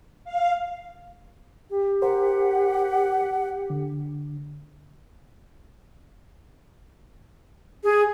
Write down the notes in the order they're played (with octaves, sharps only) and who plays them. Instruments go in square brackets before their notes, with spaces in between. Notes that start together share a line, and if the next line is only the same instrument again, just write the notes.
[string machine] F5
[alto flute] G4
[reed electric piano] A#4 C5 [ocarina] F#5
[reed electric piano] D3
[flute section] G#4